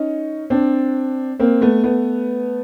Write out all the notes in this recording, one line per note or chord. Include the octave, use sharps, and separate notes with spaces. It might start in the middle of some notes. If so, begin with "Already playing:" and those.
Already playing: C#4 D#4
C4 D4
A#3 C4
A3 B3
A3 B3